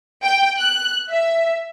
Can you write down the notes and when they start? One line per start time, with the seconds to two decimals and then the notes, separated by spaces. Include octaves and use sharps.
0.23 G5
0.59 F#6
1.10 E5